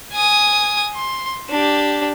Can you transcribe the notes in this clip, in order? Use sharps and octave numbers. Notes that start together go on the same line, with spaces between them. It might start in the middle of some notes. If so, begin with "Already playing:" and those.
G#5 D#6
C6
D4 G4